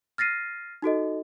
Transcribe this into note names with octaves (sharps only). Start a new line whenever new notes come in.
F6 A6 A#6 C7 D#7
D#4 F#4 A4 D#5